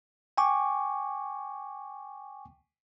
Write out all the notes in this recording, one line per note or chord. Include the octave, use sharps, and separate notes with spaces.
G5 G#5 C#6 D6